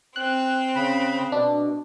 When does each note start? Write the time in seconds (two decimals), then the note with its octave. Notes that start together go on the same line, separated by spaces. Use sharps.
0.16 C4 G5 F#6
0.76 C#3 B5
1.32 B2 D4